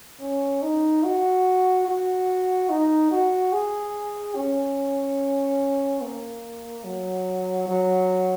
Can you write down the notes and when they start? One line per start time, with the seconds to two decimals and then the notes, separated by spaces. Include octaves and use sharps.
0.21 C#4
0.62 D#4
1.04 F#4
1.87 F#4
2.70 D#4
3.11 F#4
3.53 G#4
4.36 C#4
6.01 A#3
6.84 F#3
7.67 F#3